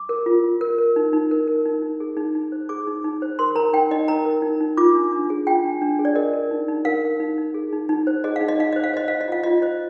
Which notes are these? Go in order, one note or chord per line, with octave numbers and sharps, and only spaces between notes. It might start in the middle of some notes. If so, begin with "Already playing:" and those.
Already playing: D6
A#4
F4
F4
A#4
A#4
D#4
D#4
A#4
A#4
D#4
D#4
G#4
D#4
D#4
C5
G#4 D6
D#4
D#4
C5
A#4 C6
A#4 A#5
D#4 G5
D#4 D#5
A#4 A#5
A#4
D#4
D#4
F4 D6
D4
D4
G#4
F4 G5
D4
D4
G#4
D5
A#4 D#5
A#4
D#4
D#4
A#4 F5
A#4
D#4
D#4
G#4
D#4
D#4
C5
G#4 D#5
F5
D#4
D#5
D#4 F5
C5 D#5
F5
C5 D#5
C5 F5
D#5
F4 F5
F4 D#5
C5 D#5